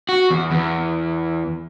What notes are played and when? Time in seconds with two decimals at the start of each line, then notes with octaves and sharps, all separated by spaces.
0.09 F#4
0.31 E2
0.51 E2